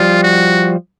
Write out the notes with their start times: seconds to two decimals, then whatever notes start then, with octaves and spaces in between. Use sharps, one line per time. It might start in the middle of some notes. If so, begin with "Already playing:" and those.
Already playing: F3 G3 F4
0.23 F#4